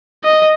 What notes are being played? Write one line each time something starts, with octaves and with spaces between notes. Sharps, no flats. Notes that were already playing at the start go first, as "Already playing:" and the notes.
D#5